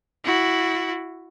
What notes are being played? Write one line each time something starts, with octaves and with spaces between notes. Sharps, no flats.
E4 F#4